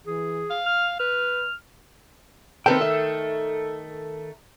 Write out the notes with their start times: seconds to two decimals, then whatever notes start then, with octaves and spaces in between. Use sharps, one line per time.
0.07 E3 G#4
0.50 F5
0.66 F6
0.99 B4 F6
2.66 D#3 A3 C4 A4 B4 G5
2.81 E5